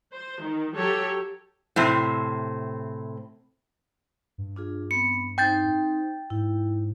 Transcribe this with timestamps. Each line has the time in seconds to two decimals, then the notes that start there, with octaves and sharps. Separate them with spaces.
0.12 C5
0.43 D#3
0.75 F#3 G4 A4 C#5
1.76 A2 C3 C4
4.38 G2
4.56 D4 F4 G#4
4.91 B3 C4 B5 C#7
5.38 C4 D#4 C5 G5 G6 A6
6.30 G#2 E4